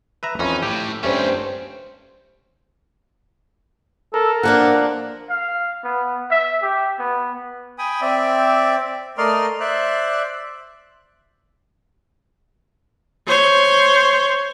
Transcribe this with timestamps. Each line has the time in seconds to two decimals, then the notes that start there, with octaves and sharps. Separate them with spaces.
0.23 B4 E5 A#5
0.39 F2 E3 C#4 D#4
0.62 A2 G4
1.03 G2 A3 C4 C#4 C5
4.14 A4 A#4
4.43 F3 A#3 D4 F#5
5.29 F5
5.84 B3
6.31 E5
6.62 G4
6.99 B3
7.78 G5 G#5 B5 D#6
8.01 C4 D5 E5
9.18 A3 A#4 D5 D#5 C6 F6
9.60 C5 D5 E5 F#6
13.28 C5 C#5